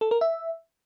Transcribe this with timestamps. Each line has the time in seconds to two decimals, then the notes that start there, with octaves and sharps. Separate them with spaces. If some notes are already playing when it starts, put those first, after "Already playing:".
0.01 A4
0.11 A#4
0.21 E5